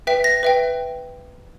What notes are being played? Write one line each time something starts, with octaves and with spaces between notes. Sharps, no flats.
B4 E5 G5 B6
A#6
B4 E5 G5